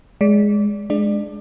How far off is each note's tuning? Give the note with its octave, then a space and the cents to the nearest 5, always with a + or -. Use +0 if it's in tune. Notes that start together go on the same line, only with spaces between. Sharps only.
G#3 +0 D5 -25
G#3 +10 D4 +10 D5 +25